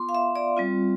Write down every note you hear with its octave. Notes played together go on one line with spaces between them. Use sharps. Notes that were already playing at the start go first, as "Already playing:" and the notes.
Already playing: B3 F4 C6 D6
F5
E5
D5
G3 C4 F4